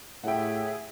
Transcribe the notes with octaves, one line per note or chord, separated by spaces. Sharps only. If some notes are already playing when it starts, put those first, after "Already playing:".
A2 G4 G#4 E5 F#5 G5